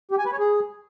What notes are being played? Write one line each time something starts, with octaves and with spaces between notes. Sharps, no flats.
G4
G#5
B4
C#5
G#4